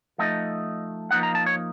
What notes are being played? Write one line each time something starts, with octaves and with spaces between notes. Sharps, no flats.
F3 A3 D#4 D#5
F3 A#3 D#4 F#5
A#5
A5
C#5